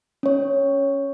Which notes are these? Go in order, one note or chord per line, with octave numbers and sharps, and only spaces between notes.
C#4 C#5